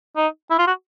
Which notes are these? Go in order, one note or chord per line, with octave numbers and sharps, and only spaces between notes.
D#4
E4
F4
F#4